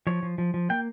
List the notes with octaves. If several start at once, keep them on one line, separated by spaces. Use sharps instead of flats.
F3 C#5
F3
F3
F3
A#3 G5